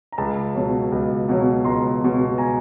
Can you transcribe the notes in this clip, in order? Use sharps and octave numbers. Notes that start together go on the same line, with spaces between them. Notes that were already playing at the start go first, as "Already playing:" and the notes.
A#5
C#2 A5 B5
B2 F#3
C#2
B2 F#3
C#2 A#5 C6
B2 F#3
G#5 A#5